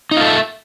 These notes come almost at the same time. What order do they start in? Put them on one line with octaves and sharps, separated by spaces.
D#4 F4 A4 E5